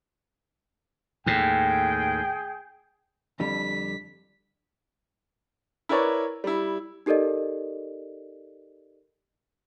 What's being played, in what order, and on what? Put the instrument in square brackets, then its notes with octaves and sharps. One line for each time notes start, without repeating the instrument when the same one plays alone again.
[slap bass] D#2 A2 [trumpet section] G#4 G5
[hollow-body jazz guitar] F2 D3 G3 [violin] B6
[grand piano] E4 A#4 B4 C#5 D5
G3 E4
[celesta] D#4 G4 A4 A#4 D5 D#5